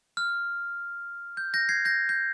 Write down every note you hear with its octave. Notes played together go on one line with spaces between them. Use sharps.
F6
G6
G6 A#6
G#6 C7
G6 A#6
G6